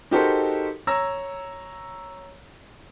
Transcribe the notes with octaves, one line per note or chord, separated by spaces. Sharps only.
D#4 F#4 G4 A4 A#4 C5
C#5 A#5 E6 A#6